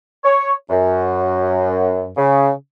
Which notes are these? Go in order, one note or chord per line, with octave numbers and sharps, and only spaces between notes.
C#5
F#2
C#3